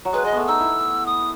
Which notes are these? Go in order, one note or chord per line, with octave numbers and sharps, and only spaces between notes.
F#3
G#3 B4
G#3 D#5
A3 B3
D#4 E6
E4
D#6